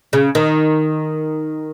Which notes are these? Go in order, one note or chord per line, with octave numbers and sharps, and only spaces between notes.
C#3
D#3